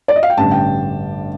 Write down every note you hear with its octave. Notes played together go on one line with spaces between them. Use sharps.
D5
D#5
F5
G5
A1 G2 D3 A5
G5